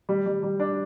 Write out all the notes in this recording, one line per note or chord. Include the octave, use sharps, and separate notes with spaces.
G3
G3
G3
D4